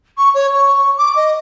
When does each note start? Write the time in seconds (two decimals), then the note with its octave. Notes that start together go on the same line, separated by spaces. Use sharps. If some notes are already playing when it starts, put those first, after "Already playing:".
0.18 C#6
0.34 C#5
0.53 C#6
0.97 D6
1.16 D#5